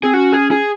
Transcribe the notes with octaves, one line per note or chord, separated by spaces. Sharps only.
C4 G#4
C#4 F#4
G#4
G#4